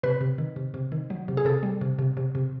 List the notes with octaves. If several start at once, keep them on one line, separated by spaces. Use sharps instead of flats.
C3 B4
C3
D#3
C3
C3
D#3
F#3
C3
G#4
C3 A4
G3
C3
C3
C3
C3